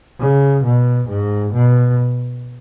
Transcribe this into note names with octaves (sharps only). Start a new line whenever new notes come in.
C#3
B2
G#2
B2